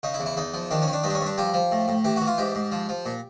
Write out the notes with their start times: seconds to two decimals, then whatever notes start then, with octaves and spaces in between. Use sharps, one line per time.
0.03 C#3 D#4
0.14 E4
0.20 E2
0.26 E4
0.37 E2 D#4
0.54 F3
0.71 D#3 D4
0.82 C#4
0.87 D#3
0.93 D4
1.03 G2 D#4
1.10 D4
1.15 C#4
1.21 G2
1.26 D4
1.38 F3 G4
1.54 F3
1.72 A2
1.88 A2
2.04 E3 G4
2.16 E3 F#4
2.27 F4
2.38 G#2 G4
2.55 G#2
2.72 F3
2.89 F3
3.06 A#2